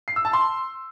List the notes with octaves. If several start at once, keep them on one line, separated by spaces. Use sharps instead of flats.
C7
E6
A5
C6